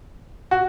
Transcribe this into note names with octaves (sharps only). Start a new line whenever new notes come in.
F#4